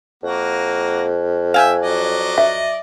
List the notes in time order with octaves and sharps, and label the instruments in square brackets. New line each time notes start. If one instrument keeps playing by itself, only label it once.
[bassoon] F2 [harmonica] A#3 F#4
[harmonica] E5 G5 [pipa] F5 G#5
[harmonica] F#3 D5 D#5
[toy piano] E5